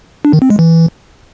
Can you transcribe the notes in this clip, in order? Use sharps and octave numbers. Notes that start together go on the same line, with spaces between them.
D4
D#3
C4
G#3
E3